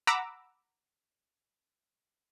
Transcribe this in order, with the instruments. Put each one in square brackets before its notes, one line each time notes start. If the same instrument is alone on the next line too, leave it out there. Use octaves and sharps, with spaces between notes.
[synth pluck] F#5 A#5 B5 D6 E6